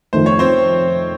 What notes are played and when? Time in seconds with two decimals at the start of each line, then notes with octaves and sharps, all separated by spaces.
0.13 F2 D#3 A3 C5
0.26 C#5
0.39 C4 C5